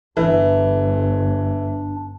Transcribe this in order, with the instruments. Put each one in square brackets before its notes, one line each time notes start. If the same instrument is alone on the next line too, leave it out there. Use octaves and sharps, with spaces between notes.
[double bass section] G1 [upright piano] E3 [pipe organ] D4